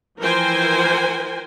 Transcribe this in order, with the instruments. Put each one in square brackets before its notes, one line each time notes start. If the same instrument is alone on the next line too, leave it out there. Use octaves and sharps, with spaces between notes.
[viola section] E3 F3 A#4 C5 G5 G#5